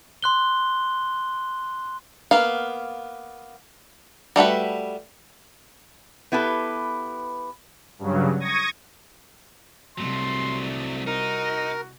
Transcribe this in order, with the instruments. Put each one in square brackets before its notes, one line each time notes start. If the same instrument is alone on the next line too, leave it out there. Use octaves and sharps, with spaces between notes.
[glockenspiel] C6 F#6 G7
[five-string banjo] A#3 B3 F5
G3 A3 F#4 B4
[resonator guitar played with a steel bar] B3 E4 G4 A4 B4
[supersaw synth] G2 C#3 F#3
C#6 D#6 G#6 A#6
[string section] C2 [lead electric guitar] F#3 A3 [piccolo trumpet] C6
[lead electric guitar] D#4 [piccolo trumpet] F#4 [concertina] A#4